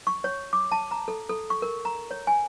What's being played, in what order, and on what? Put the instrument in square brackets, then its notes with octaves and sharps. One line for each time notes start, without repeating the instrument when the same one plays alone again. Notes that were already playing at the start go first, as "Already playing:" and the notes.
[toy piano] C#6
C#5
D6
A5
A#5
A4
A4
C#6
A#4
A#5
C#5
G#5